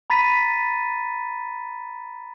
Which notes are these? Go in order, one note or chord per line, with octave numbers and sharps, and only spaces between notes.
A#5 B5 A6 B6 D#7